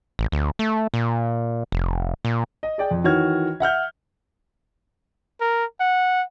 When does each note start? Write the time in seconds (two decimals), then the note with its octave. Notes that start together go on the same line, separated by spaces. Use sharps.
0.19 A1
0.32 D2
0.59 A3
0.94 A#2
1.72 F1
2.25 A#2
2.63 D#5
2.78 G#4 D5 G5
2.91 F2
3.04 D#3 E3 F#4 C#5 F6 G#6
3.60 E5 F#5 F6 G6
5.41 A#4
5.80 F#5